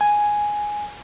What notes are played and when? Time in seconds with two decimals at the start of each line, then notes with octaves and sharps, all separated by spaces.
0.01 G#5